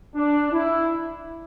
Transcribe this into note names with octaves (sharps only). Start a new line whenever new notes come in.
D4
E4